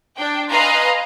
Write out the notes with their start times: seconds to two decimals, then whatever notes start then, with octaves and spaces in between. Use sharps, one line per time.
0.17 D4 G5
0.49 B4 D#5 F5 G#5 A#5 C6